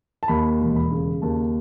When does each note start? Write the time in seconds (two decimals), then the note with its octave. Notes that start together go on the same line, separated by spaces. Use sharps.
0.23 A5
0.28 D#2 B5
0.60 E1
0.76 B5
0.91 C#3
1.22 D#2 A5